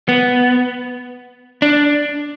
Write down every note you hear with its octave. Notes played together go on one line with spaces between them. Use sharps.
B3
D4